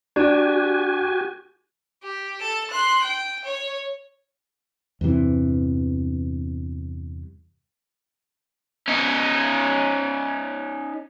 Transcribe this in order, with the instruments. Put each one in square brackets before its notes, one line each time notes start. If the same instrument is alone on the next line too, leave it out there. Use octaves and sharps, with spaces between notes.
[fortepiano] D4 [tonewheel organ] F#4 G4 G#5
[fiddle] G4
A4 A5
C6 F#6
G5
C#5
[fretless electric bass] E2 G2 C3 E3
[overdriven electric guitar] C#4 D#4